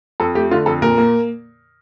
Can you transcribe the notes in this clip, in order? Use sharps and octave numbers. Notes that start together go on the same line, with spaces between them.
F2 A4
A3 G4
D3 F4
F2 A4
A#2 A#4
A#3